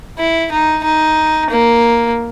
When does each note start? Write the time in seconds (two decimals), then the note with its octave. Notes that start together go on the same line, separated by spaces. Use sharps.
0.18 E4
0.51 D#4
0.84 D#4
1.50 A#3